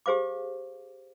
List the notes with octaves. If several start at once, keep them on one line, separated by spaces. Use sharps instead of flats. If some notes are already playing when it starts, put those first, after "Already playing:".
G4 G#4 C5 F5 D6